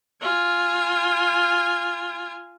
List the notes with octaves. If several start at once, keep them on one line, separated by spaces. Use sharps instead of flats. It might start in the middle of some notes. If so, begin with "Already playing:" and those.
F4 G#5